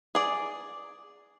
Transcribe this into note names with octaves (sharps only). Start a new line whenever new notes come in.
G#4 D5